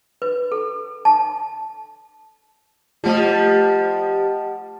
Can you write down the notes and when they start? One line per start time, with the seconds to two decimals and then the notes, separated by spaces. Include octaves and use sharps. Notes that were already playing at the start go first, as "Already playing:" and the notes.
0.22 B4
0.52 A4
1.05 A5
3.04 F3 G3 A3 F4 D#5 F#5 A5